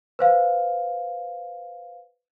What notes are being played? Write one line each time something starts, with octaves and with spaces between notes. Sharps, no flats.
B4 C5 F5